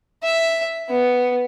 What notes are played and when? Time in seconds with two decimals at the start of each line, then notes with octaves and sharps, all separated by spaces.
0.23 E5
0.89 B3